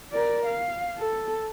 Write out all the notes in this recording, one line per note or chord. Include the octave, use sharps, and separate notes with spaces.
A#4 D5
F5
A4